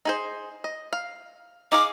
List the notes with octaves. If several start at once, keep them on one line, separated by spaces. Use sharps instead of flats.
D#4 G#4 C5
D#5
F5
D#4 G#4 F5 D6